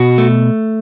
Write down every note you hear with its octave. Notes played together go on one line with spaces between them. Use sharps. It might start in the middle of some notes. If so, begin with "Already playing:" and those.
Already playing: B2 F#4
A3